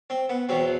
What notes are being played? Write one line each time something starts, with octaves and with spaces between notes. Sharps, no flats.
C4
B3
E2 B2 F#3 C4